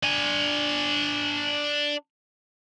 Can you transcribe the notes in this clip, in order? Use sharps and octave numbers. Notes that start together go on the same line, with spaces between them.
D4 G#5